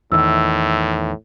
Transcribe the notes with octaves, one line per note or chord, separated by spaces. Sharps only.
E2 A2 D#3 E6